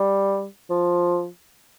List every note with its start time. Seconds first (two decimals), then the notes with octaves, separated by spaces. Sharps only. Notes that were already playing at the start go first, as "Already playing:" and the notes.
Already playing: G3
0.70 F3